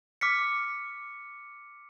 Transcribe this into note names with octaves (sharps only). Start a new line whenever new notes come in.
D6 F6 B6 C#7